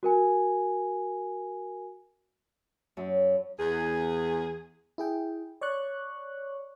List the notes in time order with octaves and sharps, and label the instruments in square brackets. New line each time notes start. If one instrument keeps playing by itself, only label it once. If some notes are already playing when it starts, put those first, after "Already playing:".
[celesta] F#4 A#4 G#5
[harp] F#2
[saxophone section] E2 G#4
[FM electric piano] E4 G#4 G5
C#5 D5 C#6 F#6